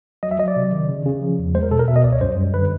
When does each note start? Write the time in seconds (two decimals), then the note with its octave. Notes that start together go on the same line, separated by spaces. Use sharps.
0.23 F#3 D#5
0.31 E5
0.39 F#3 D#5
0.48 D5
0.56 C3
0.72 D#3
0.89 C#3
1.06 C#3
1.21 F3
1.39 E2
1.55 G#3 C5
1.63 A#4
1.71 B2 A4
1.79 A#4
1.88 B2 E5
1.96 D#5
2.04 C#2 D5
2.12 C#5
2.21 F#2 C5
2.37 G3
2.54 D3 B4